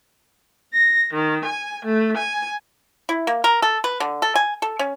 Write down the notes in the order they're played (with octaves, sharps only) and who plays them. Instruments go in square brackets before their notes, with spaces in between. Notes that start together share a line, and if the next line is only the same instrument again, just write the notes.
[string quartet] A#6
D#3
G#5
A3
G#5
[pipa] E4
A#3
A#4
A4
B4
D3
A4
G#5
A4
C#4